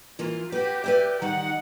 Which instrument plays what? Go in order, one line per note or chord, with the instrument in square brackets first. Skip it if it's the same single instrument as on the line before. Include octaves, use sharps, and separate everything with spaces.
[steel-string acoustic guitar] E3 A#3 [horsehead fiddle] F4
[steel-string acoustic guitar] F#4 B4 [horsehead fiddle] G4
[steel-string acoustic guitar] B4 D5 E5
[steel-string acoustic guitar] D#3 G3 D#4 [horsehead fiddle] F#5